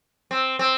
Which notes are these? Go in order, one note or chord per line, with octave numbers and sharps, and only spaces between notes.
C4
C4